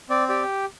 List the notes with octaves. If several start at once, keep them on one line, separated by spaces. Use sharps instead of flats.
C4 D5
G4 D5